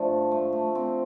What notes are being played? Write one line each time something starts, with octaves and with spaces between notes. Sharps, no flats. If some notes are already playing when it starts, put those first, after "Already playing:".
Already playing: G2 D3 F3 A3
A3
A3
C4